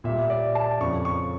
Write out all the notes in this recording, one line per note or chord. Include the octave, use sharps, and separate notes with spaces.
A#2 G3 E5
D5
A5
F2 C#3 F3 C#6
C#6